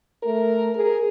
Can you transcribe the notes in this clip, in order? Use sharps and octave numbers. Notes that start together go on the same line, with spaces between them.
A3 A#4
G#4 A#4